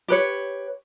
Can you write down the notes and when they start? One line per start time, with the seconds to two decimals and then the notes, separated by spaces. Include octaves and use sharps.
0.08 G4 B4 C#5